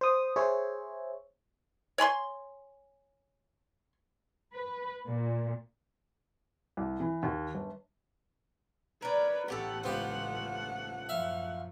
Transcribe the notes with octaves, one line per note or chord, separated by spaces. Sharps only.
C5 D#6
G#4 C5 C#5 E5
C#5 G#5 B5 C6
B4
A#2
C2
E3
D#2
G1
A#4 B4 C#5 D5
A1 A3 B3 C#4 G4 A4 F#5
C#2 B3 F4 G4 C5
F#2 F3 E5 F5